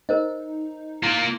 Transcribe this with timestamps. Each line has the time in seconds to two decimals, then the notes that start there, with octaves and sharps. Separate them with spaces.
0.09 D#4 A#4 C5 D#5
1.03 A#3 E4 F4